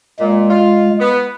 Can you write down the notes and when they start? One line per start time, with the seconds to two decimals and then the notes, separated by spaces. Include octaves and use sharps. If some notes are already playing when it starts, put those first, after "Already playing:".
0.20 A#2 G#3
0.50 F4
1.00 B3